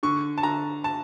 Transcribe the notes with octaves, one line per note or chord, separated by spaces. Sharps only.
D3 C#6
A5
D3 A#5
A5